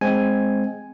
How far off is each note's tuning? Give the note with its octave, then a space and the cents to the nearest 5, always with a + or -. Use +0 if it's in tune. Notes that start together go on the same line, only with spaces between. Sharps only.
G#3 +5 C4 +0 G#5 +0